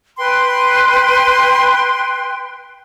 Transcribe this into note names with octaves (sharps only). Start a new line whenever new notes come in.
B4 G5 C6